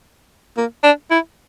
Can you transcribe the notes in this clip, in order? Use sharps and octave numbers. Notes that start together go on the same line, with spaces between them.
A#3
D4
E4